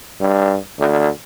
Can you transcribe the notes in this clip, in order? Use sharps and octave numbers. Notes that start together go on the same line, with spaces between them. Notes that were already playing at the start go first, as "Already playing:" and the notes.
G2
D2